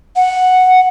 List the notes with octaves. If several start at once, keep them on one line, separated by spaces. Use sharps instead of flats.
F#5